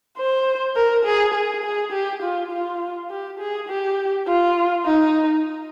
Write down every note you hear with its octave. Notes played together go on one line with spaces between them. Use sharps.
C5
A#4
G#4
G#4
G#4
G4
F4
F4
G4
G#4
G4
F4
D#4